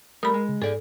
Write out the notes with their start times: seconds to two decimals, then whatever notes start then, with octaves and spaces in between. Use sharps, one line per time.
0.23 G3 A3 A#4 B5 D#6
0.34 G#3
0.49 C#3
0.62 G#2 G#4 A4 D5